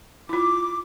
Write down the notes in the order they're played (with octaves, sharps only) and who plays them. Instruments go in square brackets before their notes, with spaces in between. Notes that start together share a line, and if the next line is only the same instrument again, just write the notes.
[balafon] E4 F4 [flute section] D6